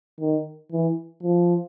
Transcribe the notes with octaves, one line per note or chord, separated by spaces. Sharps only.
D#3
E3
F3